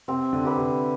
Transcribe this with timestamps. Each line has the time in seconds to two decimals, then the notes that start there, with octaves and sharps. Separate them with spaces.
0.08 C3 C4
0.33 D3
0.45 G4 B4
0.58 C3